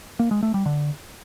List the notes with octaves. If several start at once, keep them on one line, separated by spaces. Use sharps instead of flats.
A#3
G#3
A3
G3
D3